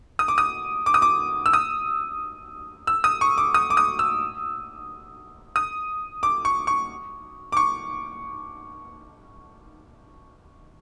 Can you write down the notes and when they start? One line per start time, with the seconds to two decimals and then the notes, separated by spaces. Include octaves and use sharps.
0.19 D#6
0.28 D6
0.38 D#6
0.86 D6
0.94 D#6
1.02 D6
1.46 E6
1.53 D#6
2.87 E6
3.04 D#6
3.21 C#6
3.38 D6
3.54 D#6
3.70 D6
3.77 D#6
3.99 E6
5.56 D#6
6.23 D6
6.45 C#6
6.67 C#6
7.52 D6
7.57 C#6